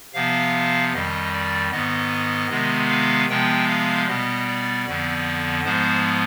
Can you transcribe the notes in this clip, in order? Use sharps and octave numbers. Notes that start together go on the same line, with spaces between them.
C3 F3 B3 F5
F2 D#3 G3 D#5
D5
G#2 D#3 B3 D#5
C3 D#3 G#3 B3
F5
C3 F3 G#3 B3 G5
F5
B2 G3 B3 D#5
D5
F2 D3 F3 B3 D5
G#2 F3 G#3 B3 C5